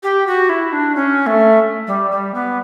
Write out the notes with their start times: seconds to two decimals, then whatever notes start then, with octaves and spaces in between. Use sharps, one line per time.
0.03 G4
0.27 F#4
0.49 E4
0.72 D4
0.95 C#4
1.26 A3
1.87 G3
2.11 G3
2.34 B3